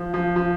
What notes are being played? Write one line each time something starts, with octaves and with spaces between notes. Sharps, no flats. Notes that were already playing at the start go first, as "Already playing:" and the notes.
Already playing: F3
F3
F3